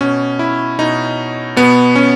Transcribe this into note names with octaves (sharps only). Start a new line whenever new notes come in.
B2 C#4
E4
B2 D#4
B2 B3
C#4